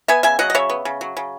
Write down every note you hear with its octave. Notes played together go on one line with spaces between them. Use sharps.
B3 E5 G#5
C#3 E5 G#5
F#3 D#5 F#5
D#5
C#3 C#5 E5
B3
C#3
F#3
C#3